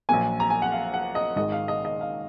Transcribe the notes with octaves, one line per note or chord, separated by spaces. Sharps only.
A#1 A#2 F#3 A#3 G#5
A#5
G#5
F#5
F5
F#5
D#5
G#1 G#2 D#3 G#3 D#5
F5
D#5
D#5
F5